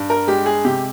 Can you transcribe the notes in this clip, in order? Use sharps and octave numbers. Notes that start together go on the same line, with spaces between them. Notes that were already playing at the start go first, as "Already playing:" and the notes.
Already playing: G2
A#4
G#3 G4
G#4
C3 G4